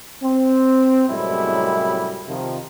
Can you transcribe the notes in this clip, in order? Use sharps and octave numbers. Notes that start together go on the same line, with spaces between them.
C4
F#2 A2 C3 G3 G#3 E4
C3 D#3 F3